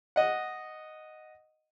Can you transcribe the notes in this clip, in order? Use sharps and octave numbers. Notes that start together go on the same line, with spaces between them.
D#5 F#5